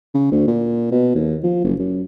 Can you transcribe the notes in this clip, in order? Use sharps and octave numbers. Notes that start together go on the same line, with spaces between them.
C#3
D2
A#2
B2
D#2
F3
F#1
F#2